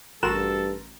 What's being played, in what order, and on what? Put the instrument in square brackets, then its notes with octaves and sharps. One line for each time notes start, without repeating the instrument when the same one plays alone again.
[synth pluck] A1 F#4 E7 [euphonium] G2 [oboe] A4 [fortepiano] A#4 C6